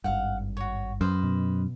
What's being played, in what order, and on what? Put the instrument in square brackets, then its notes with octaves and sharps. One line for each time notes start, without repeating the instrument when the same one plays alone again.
[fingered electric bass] G#1 G2 [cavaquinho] F5 F#5
[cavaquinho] F#4 C#5
[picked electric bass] F#2 [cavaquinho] B4 C5 D#5
[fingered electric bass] B2